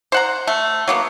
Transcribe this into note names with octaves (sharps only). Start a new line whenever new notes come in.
C5 F#5 A#5
A3
F#3 A#3 B3